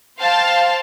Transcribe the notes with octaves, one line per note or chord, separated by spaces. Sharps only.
C5 F5 G5 A5 C6